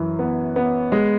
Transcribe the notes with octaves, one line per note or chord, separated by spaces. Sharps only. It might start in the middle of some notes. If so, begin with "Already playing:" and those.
Already playing: F#2 E3
B3
B3
G#3